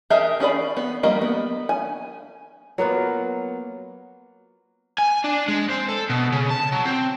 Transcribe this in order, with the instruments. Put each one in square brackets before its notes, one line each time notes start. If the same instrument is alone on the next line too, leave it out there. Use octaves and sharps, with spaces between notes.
[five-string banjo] G4 G#4 A#4 D#5 E5
C#4 G#4 D5 B5
B3
F#3 G3 A#3 A#4 D#5
B3
G#5
[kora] F#3 A#3 B3 F4
[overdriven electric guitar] G#5
D4
G#3
C4
A4
B2
C#3
A5
F#3
C4